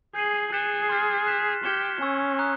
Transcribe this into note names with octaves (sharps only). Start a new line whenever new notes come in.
G#4 G6 C7 D#7 F#7
G#4 F#6 A6 C#7 E7 G7
C6 F6 A6 C7
F#6 B6 E7
G4 F6 G#6 C#7 E7 G7
C#4 G#5 C#6 E6
A#5 D#6 F#6